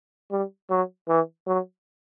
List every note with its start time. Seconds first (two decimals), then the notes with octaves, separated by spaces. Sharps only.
0.31 G3
0.70 F#3
1.08 E3
1.47 F#3